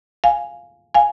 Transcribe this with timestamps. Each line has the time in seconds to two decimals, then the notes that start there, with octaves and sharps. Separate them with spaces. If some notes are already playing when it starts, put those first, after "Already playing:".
0.24 F5 G#5
0.94 F5 G#5